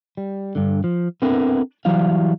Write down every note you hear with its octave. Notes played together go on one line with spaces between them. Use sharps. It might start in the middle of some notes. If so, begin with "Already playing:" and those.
G3
G2 D3
F3
B3 C4 D4 E4 A4 A#4
E3 F#3 G3 E4 F5